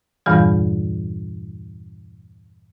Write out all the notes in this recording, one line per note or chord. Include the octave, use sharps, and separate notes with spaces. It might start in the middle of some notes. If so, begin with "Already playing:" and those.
E2 G2 A#2 E3 G3